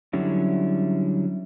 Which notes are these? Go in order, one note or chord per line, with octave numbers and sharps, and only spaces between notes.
D3 F#3 G3 C#4 E4